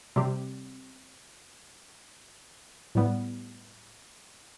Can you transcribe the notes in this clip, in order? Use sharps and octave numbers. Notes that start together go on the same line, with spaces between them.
C3 G3 C4 G4
A2 G3 B3